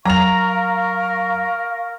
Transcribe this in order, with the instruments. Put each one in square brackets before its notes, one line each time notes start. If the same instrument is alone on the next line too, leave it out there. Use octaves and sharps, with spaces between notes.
[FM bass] F#3 [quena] A#4 [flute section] F5 C#6 [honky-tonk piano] A#5 F7